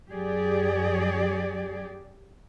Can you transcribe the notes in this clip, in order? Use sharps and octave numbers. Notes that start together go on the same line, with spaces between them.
F#2 F#3 G4 G#4 D5